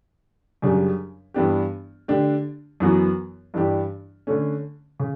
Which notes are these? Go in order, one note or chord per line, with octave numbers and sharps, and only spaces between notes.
F#2 C#3 G3 D4
G2 E3 B3 D4 G4
D3 A3 D4 G4
F#2 E3 B3 F#4
G2 E3 G3 D4 G4
D3 A3 C#4
C#3